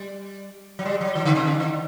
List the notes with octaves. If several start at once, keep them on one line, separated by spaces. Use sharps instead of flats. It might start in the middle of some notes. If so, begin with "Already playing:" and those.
Already playing: G3
F#3
G3
F#3
D#3
D3
C3
D3
D#3